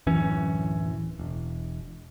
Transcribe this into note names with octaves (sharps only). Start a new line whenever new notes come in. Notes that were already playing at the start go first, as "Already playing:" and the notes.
D1 F#2 E3 C#4
E1